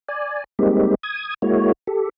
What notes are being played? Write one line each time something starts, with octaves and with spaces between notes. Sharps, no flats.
D5 G#5
G3 G#3 A#3 C4 D#4 G4
D#6 G#6
G#3 A#3 E4 F#4 C#5
G4 A4